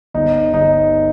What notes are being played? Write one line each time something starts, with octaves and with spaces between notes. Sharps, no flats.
G1 D#4
G1 D#4